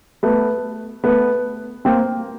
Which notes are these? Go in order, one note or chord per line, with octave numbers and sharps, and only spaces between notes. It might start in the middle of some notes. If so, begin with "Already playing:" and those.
A3 B3
A3 B3
A#3 C4